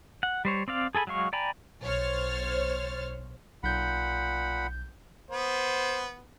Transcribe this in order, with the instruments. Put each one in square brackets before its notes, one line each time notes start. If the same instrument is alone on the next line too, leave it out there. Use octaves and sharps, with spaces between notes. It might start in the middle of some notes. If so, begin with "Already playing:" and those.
[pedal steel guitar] F#5
G3 C5 C#5
C4 D5 F5
G#4 A4 G#5 B5
F#3 G#3 F5 C#6
D5 G5 G#5 A#5 B5
[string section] B1 C5 C#5 F6 A6
[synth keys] B1 G6 [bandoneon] A#2 F#5 B5
[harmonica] B3 [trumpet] C5